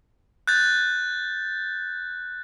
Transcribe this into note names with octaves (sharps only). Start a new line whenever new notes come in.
F#6 G6 A6